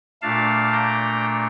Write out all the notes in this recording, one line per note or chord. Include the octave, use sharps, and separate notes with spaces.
A#2 A3 D4 F5 A5
G5 A#5